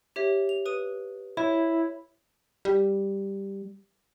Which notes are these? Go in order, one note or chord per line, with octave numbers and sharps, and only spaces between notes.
G4 C#5 E5
F7
B4 D#6 D#7
E4 C#5
G3